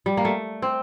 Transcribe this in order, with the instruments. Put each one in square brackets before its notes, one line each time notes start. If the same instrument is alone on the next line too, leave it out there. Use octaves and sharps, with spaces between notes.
[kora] G3
A#3
A3
C4